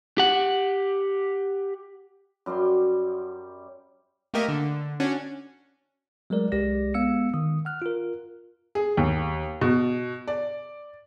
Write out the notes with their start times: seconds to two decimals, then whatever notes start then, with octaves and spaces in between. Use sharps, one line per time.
0.18 G4 F#5
2.46 F#2 G3 G4 C6
4.34 A3 A#3 G4 A#4 D#5 E5
4.48 D3
5.00 C#4 D4 F#4
6.30 F#3 G#3 A3 A#4 D5
6.52 C2 G#3 G4 D5 A#6
6.94 G#3 B3 F5 E6 C#7
7.34 D#3 D#6
7.65 F#5 F6 F#6
7.82 F4 A#4
8.75 G#4
8.97 D#2
9.61 B2
10.28 D5